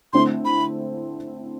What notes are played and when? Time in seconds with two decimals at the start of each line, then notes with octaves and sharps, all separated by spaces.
0.13 D3 A3 C4 E4 C6
0.45 B5